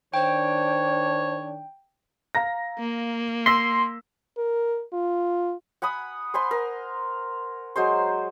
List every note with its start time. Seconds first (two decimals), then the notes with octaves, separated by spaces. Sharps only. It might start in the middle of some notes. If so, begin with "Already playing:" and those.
0.14 D#3 D4 C5 C#5 G5
2.35 F5 A#5 A#6
2.79 A#3
3.46 C6 E6 A#6 B6
4.37 A#4
4.93 F4
5.82 F#5 G#5 B5 D#6
6.34 C5 G#5 B5 C6
6.51 A#4
7.76 F#3 G#3 C5 C6